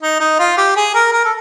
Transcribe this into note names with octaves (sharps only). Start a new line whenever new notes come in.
D#4
D#4
F4
G4
G#4
A#4
A#4
A4